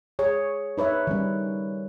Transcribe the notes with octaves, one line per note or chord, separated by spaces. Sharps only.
G#4 C#5
D#4 B4 C#5 E5
D#3 G3 C#4